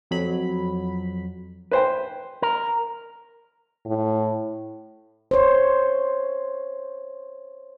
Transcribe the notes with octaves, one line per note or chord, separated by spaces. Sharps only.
F2 F#3 B5
B4 C5 G5
A#4
A2
C5 C#5